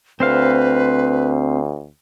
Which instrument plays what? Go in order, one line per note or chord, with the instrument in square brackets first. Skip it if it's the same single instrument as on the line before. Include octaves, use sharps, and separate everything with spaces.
[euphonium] D2 [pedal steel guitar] C4 C5 F5 [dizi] B4